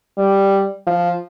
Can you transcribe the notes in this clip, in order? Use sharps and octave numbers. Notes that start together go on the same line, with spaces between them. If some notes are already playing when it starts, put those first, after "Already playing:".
G3
F3